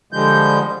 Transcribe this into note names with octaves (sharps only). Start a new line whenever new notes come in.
D3 F3 G3 G#3 G6